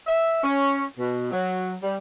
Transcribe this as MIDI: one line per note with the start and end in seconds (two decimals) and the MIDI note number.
0.07 0.42 76
0.44 0.84 61
0.98 1.28 47
1.32 1.73 54
1.83 1.96 55